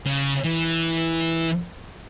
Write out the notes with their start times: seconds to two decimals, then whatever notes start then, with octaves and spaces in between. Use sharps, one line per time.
0.05 C#3
0.44 E3